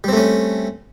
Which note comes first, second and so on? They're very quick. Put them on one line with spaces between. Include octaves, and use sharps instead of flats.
G3 C4 A3 C#4